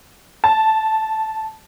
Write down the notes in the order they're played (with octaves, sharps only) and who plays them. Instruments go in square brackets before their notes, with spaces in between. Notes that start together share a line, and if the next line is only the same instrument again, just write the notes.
[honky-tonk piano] A5